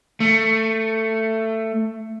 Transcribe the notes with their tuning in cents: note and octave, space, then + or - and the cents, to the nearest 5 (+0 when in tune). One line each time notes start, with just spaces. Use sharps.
A3 +15